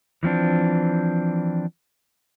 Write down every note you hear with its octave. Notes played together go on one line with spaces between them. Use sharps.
E3 F3 C4 D4